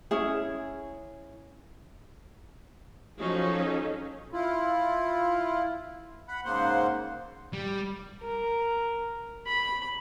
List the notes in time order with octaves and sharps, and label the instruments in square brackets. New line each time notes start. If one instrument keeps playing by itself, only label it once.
[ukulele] C#4 E4 G#4
[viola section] F3 F#3 C#4 D#4 G#4 A4
[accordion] E4 F4
F#5 B5
G#2 C#3 A#3 C5 F#5 C6
[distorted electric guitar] G3
[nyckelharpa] A#4
B5